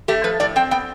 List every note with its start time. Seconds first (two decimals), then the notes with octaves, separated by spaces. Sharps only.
0.08 A3 G4
0.24 F3 B4
0.40 A2 D5
0.56 C4 G5
0.71 B3 G5